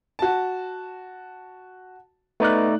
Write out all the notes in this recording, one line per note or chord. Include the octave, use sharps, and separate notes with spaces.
F#4 A5
A3 B3 D#4 D5 F#6